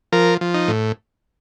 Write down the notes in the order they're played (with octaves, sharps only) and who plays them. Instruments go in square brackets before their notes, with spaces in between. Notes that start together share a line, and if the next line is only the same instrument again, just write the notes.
[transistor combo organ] F3 A#4
F3
D#4
A2